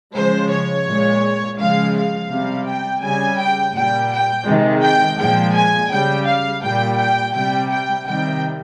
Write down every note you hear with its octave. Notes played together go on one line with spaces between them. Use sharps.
C#3 F3 G#3 C5
C#5
A#2 G#3
C#3 F3 G#3 F5
F5
C3 G3
G5
C#3 G3 G#5
G5
A#2 G3 G5
G5
C3 D#3 G#3
G5
A#2 F3 G#3 G5
G#5
C#3 G3 G5
F5
A#2 G3 G5
G5
C3 G3 G5
G5
C3 D#3 G3 G5